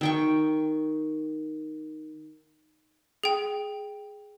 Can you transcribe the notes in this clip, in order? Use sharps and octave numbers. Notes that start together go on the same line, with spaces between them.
D#3 G5 C#6
G#4 G5